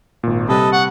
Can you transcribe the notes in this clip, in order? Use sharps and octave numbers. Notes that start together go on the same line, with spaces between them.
G#1 A#2
C3 G3 A4 B4 D#5
F#5 C#6